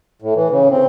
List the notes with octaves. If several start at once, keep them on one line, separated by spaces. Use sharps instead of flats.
A2
E3
C#3
C4